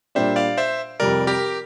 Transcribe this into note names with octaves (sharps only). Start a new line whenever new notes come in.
A#2 G3 D4 G4 C5 E5
D5 F5
C5 E5
F2 C3 G3 A#4 D5
G4 A#4